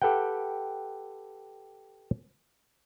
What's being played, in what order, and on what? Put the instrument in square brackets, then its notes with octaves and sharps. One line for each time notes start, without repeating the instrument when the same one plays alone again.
[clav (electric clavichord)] G4 A4 B4 F#5 G5